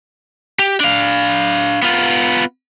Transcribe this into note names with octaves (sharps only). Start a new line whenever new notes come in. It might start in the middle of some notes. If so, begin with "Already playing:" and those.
G4
D4 F5
B3 F4